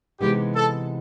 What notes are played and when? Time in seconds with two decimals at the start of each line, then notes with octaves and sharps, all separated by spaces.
0.21 C3 E3 G#3 B3 D#4 G4
0.55 A4